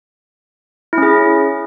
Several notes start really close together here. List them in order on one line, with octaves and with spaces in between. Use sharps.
E4 C#4 G#4